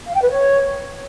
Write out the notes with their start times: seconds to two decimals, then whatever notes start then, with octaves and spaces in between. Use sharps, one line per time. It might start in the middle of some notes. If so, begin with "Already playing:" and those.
0.07 F5
0.15 G5
0.22 B4
0.30 C#5